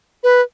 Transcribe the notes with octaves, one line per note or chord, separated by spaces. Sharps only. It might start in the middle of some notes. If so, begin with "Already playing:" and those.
B4